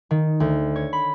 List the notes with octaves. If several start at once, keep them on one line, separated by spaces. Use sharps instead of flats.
D#3
D2
C#5
B5